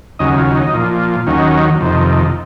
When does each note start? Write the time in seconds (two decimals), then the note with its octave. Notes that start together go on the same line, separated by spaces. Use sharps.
0.19 D#2 C#3 F#3 D#5
0.38 F4
0.55 D#4
0.73 A#2 F3
1.27 D#2 D#3 F#3 C#4
1.81 F2 C3 D#3